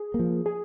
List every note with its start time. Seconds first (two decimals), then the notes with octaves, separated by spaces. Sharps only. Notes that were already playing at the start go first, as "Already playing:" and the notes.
Already playing: G#4
0.14 A#3
0.19 F3
0.46 G#4